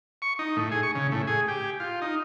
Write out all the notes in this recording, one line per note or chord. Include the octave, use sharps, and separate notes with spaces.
C#6
D#4
A2
G#4
C#6
C#3
A2
G#4
G4
F4
D#4